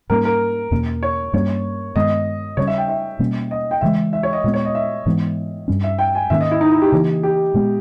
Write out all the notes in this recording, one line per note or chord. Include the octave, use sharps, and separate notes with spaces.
G#2 G3 A#3 C#4 A#4
A#4
E2 B2 A#3 C#4
C#5
G2 G3 A#3 C#4 C#5
G2 D#3 G#3 B3 D#5
C#3 G3 C#4 C#5
E5
G5
E5
B2 G3 A#3 C#4
D#5
G5
C#3 E3 G#3 E5
E5
C#5
D#5
A#2 G#3 B3
C#5
D#5
E5
G#2 E3 G#3 B3
G2 G3 C#4
E5
G5
G#5
G#2 D#3 A#3 C#4 E5
D#5
E4
D#4
E4
G4
C#3 E3 A#3
G4
A#2 G#3 B3